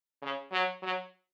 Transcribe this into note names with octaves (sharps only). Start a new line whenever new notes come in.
C#3
F#3
F#3